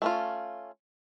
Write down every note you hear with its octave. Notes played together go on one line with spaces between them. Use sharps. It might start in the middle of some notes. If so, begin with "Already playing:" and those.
A3 C#4 F4